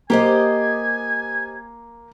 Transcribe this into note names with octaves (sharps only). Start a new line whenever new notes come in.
A#3 G4 C5 D#5 G#5